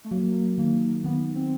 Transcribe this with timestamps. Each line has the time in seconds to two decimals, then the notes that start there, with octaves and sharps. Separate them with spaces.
0.04 A3
0.11 F#3 A#3
0.58 D#3 A#3
1.04 D#3 B3
1.35 C4